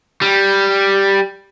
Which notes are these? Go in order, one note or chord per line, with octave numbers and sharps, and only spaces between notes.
G3